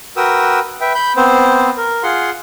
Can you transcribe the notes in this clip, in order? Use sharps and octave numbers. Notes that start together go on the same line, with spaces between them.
F#4 A#4 B4 G5 D#6 E6
B4 E5 G5
B5 G6
B3 C4 C5
A#4
F4 G#4 F#5 C6